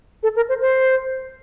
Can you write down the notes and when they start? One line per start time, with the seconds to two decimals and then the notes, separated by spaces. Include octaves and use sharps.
0.23 A4
0.36 A#4
0.49 C5
0.61 C5